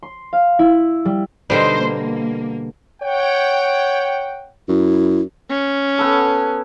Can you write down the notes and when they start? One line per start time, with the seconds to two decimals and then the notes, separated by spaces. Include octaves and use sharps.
0.03 C6
0.33 F5
0.59 E4
1.05 G3
1.50 B2 D3 G3 D#4 C5
1.82 A#3
3.02 C#5 F#5 G5
4.69 F#2 E4
5.49 C#4
5.98 B3 E4 A4